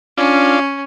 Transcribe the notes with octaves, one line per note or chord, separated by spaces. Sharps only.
C#4 D4 F4